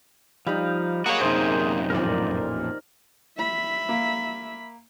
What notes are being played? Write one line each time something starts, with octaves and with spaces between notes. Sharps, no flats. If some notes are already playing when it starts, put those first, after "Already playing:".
F3 G3 D#4 F5 B5
A#3 F#4 G#4 C#5
F#2 C3 D#4 C5
A1 F2 A#2 A#4 D5
E5 B5
A#3